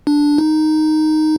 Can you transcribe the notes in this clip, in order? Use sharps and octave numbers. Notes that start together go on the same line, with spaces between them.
D4
D#4